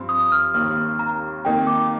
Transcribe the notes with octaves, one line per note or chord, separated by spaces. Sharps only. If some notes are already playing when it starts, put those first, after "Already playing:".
Already playing: G2 F3 C4 C6
D#6
F6
D#2 D#3 A#3 F6
A#5
F2 D#3 A#3 D#4 G5
D6